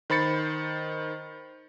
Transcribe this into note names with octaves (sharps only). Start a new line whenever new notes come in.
D#3 C5 B5 A6 C#7